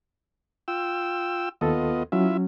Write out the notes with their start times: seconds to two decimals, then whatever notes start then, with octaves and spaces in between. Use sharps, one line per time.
0.68 F4 G5 E6
1.61 D#2 B3 F4 A4 D#5
2.12 F#3 C#4 E4 F4 E5